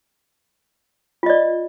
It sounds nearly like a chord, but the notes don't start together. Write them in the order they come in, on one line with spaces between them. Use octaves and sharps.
F4 D#5 D5